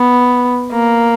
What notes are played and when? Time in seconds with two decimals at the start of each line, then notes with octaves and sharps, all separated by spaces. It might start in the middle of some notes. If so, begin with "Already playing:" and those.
Already playing: B3
0.72 A#3